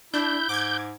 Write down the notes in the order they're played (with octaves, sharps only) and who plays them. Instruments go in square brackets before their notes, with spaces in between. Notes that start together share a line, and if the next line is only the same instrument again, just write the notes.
[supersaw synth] D4 [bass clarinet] E4 [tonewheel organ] G6
[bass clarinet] G#2 [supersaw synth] D6 G#6